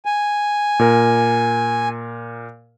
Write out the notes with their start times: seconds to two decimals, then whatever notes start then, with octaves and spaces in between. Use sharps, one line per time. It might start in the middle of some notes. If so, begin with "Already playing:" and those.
0.06 G#5
0.79 A#2 A#4